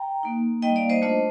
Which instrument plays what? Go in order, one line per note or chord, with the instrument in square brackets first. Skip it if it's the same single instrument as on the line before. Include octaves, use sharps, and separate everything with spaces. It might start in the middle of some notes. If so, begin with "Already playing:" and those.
Already playing: [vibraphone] G5 A#5
A#3 D#4
G3 A#3 D#4 D#5 G5
D5 F5
C5 D#5
A3 D4 F4 C5 D#5